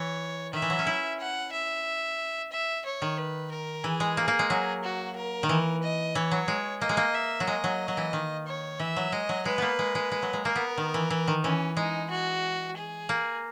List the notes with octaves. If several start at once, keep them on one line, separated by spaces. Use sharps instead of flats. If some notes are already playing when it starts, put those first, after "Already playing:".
Already playing: E3 C#5
D#3 E5
E3
F#3
C#4
E4
F#5
E5
E5
C#5
D#3
B4
A#4
E3 G#4
G#3
A#3
A#3
G#3
F#3
F#4
A#4
D#3
E3
D#5
E3 C#5
F#3
G#3
A#3 D#5
G#3
A#3
E5
F#3
G#3 D#5
F#3
F#3
E3
D#3
C#5
E3 E5
F#3
G#3 D#5
F#3
G#3 B4
A#3 B3
G#3
G#3
G#3
F#3
G#3
A#3 A#4
B3
D#3
E3
E3
D#3
E3 C#4
G#3 D#4
F#4
G#4
A#3